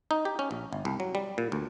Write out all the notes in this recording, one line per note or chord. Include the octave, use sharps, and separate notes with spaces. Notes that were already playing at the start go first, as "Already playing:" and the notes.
D#4
G4
C#4
A#1
G1
C2
F#3
G3
A#2
D2